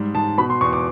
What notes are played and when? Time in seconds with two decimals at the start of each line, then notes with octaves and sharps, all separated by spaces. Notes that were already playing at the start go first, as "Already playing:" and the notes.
Already playing: G#2 G3
0.15 G#2 A5
0.38 B2 B5
0.50 C6
0.61 E2 C#6
0.73 D6